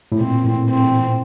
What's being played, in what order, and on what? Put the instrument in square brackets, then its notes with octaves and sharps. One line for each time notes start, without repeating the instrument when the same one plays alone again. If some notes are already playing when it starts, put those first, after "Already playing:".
[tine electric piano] A2
[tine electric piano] A#2 [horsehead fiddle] C4
[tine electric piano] A2
[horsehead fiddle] C4